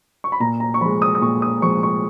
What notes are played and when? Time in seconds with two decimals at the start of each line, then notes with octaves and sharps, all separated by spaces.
0.24 C#6
0.32 B5
0.40 A#2 A#5
0.60 A#5
0.74 C#6
0.81 F3 B5
0.85 G#3
1.02 D#6
1.15 D#6
1.21 A#2 C#6
1.42 D#6
1.62 F3 G#3 C#6
1.83 C#6